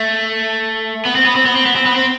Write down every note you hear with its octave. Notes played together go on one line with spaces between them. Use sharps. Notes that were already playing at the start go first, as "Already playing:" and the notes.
Already playing: A3
B3
C4
B3
C4
B3
C4
B3
C4
B3
C4